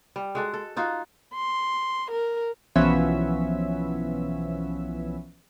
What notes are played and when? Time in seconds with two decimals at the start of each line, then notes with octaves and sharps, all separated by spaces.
0.16 G3
0.35 G#3 F#4 A4
0.54 A4
0.77 D#4 F4 F#4
1.34 C6
2.11 A#4
2.76 B1 E3 F3 B3 C#4 E5